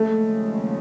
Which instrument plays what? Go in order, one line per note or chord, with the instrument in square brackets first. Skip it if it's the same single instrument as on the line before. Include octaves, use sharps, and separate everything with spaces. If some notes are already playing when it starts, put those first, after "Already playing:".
Already playing: [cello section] D#2 C#3 F3 G#3 [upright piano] A3